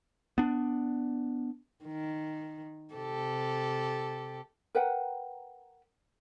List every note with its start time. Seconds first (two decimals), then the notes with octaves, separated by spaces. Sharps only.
0.38 B3 D4
1.84 D#3
2.94 C3 G4 A4
4.75 A#4 B4 F#5 G5